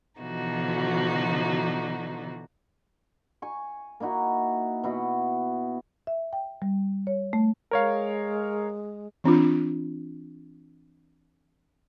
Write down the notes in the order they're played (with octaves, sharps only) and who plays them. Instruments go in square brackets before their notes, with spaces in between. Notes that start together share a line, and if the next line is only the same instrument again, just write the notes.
[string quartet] B2 D3 E3 F3 D#4 F#4
[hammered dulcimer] G#5 C#6
A#3 D#4 E4 F#4
B2 E4 F#4
[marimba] E5
G5
G3
C#5
A3
[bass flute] G#3 [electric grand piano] A#4 C#5 F5
[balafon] E3 C4 D4 F4